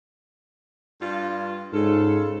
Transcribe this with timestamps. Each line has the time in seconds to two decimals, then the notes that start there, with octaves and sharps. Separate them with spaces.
0.99 G2 F4
1.73 G#2 C#3 F4 A4